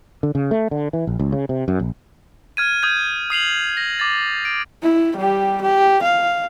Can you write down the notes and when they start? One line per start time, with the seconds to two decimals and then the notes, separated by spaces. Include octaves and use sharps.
0.23 D3
0.35 C#3
0.51 A3
0.71 D3
0.93 E3
1.07 A#1
1.19 C#2
1.32 C#3
1.49 C3
1.68 F#2
1.79 A#1
2.57 F6 G#6 D#7
2.83 D#6 G6 G#6 D#7
3.30 D#6 C7 F7 F#7
3.77 A#6
3.99 D6 A6
4.45 D7
4.83 E4
5.16 G3 G4
5.61 G4
6.02 F5